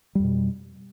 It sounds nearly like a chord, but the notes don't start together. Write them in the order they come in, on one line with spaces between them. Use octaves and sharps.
G3 F2 B2